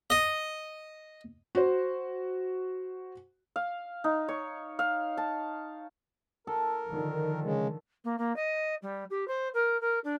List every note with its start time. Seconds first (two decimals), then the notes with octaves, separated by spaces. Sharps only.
0.10 D#5
1.55 F#4 C5
3.56 F5
4.04 D#4
4.28 C#5
4.79 F5
5.17 A5
6.47 A4 A#4
6.87 D3 D#3 F3
7.44 C#3 G#3
8.04 A#3
8.18 A#3
8.36 D#5
8.82 G3
9.10 G4
9.28 C5
9.54 A#4
9.81 A#4
10.04 D4